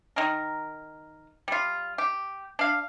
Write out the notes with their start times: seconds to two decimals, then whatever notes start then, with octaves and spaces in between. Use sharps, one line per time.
0.16 D#3 D#4 A#4
1.48 G3 F4
1.98 G4
2.59 D4 F5